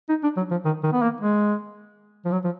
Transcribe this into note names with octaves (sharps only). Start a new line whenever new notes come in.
D#4
D4
F#3
F3
D#3
D#3
B3
A#3
G#3
F3
F#3
F3